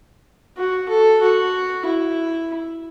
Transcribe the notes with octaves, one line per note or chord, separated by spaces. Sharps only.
F#4
A4
F#4
E4